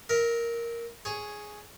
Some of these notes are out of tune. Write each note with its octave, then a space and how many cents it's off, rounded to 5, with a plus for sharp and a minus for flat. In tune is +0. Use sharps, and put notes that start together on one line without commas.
A#4 +0 E5 -30
G#4 +5 C#5 +0